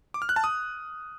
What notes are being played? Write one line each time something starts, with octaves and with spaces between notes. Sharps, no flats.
D6
F6
F#6
A5
D#6